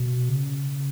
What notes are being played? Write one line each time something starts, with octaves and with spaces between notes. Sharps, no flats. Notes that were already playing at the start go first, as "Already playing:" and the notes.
Already playing: B2
C#3